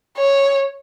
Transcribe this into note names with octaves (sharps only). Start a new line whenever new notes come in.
C#5